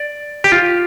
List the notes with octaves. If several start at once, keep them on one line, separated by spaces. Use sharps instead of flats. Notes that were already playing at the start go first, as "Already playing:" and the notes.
Already playing: D5
G4
F4